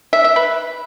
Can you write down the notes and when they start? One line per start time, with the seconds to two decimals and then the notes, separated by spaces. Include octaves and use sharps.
0.13 E5
0.24 E5
0.36 B4